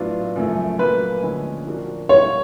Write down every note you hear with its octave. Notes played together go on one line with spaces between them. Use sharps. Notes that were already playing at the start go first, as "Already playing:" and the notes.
Already playing: A2 F#3 B3 D4 F4
F#2 C#3 F3 A3
A#2 F#3 A#3 B4
D2 D3 F3 G#3 C#4
A#2 F3 A#3 D4 F#4
E2 B2 G3 A#3 C#5